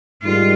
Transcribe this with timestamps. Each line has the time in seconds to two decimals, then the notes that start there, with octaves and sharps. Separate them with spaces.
0.23 G#2 D#3 G3 F4